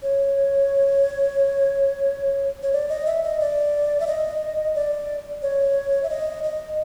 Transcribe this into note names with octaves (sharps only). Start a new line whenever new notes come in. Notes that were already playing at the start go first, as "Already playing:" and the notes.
C#5
C#5
D5
D#5
E5
D#5
D5
E5
D#5
D5
C#5
E5
D#5
D#5